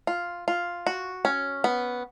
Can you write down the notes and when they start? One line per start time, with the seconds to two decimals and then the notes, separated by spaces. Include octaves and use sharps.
0.07 F4
0.48 F4
0.87 F#4
1.25 C#4
1.64 B3